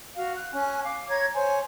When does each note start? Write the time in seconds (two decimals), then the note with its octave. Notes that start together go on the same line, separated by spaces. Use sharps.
0.16 F#4 F5
0.36 F#6
0.53 C#4 G#5 F#6
0.84 F5 D6
1.09 C#5 A#5 G#6
1.34 C5 C#5 G#5